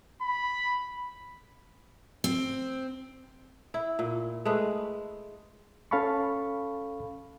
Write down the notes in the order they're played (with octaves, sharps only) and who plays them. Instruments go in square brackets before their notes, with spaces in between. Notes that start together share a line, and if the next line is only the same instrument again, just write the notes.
[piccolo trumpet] B5
[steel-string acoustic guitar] C4
[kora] E4
A#2
G#3 A3 B4
[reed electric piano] C#4 A4 F5 A5 B5 C#6